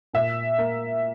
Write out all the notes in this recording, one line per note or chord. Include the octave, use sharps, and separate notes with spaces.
A#2 E5
A#3